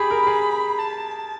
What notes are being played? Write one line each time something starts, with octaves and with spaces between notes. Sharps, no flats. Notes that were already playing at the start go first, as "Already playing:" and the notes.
Already playing: G4 G#4 B5
A#4
G#4
A5